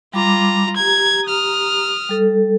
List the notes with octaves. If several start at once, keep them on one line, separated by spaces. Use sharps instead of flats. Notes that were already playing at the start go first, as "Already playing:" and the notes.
G3 F4 A#5 B5 D6
G4 A#5 G#6
D#6 F6
G3 A4